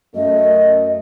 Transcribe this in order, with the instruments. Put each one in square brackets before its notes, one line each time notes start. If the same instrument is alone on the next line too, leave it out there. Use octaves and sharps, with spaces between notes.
[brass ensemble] F#2 A3 [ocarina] D#5